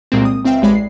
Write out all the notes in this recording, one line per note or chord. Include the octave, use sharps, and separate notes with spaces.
C2 A#2 G#3 A#3 C4
D#6
C#2 C4 E5 F5 G5
A1 G#3 D5 B5
C7